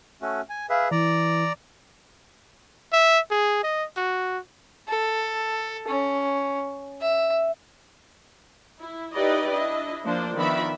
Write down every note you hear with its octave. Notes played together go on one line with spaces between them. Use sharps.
A3 C#4 F#4
G#5
G#4 B4 E5 F5
E3 D5 A#5
E5
G#4
D#5
F#4
A4
C#4
E5
E4
D#4 E4 G4 B4 D5 D#5
D4 E4 D#5
F3 A#3 D4 C5
D#3 F3 B3 D5 E5 B5